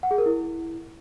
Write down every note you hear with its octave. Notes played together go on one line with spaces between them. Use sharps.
F#5
G#4
A#4
E4